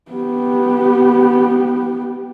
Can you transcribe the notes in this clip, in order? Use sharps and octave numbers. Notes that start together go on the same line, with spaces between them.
B3 G4